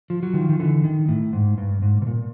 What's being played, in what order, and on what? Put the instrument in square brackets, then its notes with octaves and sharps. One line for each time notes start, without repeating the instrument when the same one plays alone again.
[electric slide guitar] F3
F#3
D#3 F3
D#3
D3 E3
D#3
A2
G#2
G2
G#2
B2
A#2